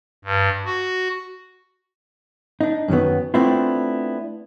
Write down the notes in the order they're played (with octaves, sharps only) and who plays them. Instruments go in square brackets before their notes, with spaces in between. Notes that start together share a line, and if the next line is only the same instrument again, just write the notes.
[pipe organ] G2
F#4
[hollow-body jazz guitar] D4 D#4
F#2 D#3 F#3 B3
A3 B3 C4 D4 E4 F4